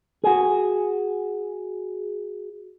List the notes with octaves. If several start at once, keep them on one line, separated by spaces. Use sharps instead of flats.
F#4 G#4